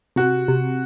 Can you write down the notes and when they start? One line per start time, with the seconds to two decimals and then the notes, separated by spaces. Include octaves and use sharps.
0.16 C3 F#4
0.48 C3